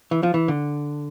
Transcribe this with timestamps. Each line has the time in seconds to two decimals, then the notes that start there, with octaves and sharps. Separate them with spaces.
0.11 E3
0.23 F3
0.34 E3
0.48 D3